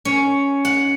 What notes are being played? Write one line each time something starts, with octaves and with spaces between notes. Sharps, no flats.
C#4
F#5